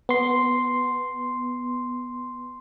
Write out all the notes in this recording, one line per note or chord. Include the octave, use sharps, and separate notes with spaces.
B3 C6